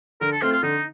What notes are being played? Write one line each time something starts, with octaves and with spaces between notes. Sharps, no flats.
D3 A#4
A4
A3 C4 F4
F4
D3 D#4